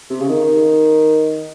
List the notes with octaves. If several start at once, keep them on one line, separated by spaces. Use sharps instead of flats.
C3
C#3
D#3